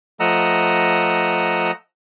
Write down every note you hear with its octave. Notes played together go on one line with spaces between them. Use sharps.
F3 A3 D#5 F#5 A#5 E6